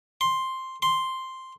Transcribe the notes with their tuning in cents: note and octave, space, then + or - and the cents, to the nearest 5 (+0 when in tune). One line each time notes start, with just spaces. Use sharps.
C6 +5
C6 +0